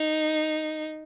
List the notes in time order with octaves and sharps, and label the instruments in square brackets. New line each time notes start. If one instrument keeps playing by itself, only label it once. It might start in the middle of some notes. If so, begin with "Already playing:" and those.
Already playing: [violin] D#4